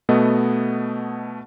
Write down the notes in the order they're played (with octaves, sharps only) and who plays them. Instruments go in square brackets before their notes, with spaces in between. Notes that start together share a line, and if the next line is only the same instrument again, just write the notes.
[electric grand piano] B2 A3 B3 D#5